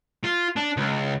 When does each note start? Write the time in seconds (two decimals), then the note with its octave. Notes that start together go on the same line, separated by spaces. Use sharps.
0.24 F4
0.56 D4
0.77 C#2